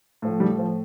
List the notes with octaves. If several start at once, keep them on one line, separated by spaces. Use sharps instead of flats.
A2 F3
G3
F3